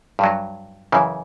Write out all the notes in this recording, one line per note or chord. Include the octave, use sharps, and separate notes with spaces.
G2 F#3
F#2 C#3 E3